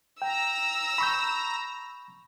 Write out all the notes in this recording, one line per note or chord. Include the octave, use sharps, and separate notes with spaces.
G5 A#5 E6
B5 C#6 G6